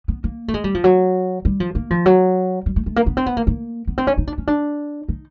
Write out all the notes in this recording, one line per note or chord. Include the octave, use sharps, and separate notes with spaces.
B3
A#3
A3
G#3
G3
F3
F#3
G3
F3
A#3
F3
F#3
G3
A3
A3
A#3
B3
C4
B3
A#3
A#3
B3
C4
C#4
D#4
D4
C#4
D4
D#4